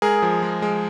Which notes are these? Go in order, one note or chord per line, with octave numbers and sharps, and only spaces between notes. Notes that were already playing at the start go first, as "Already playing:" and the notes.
G#3 G#4 A#4
F3
G#3
G#3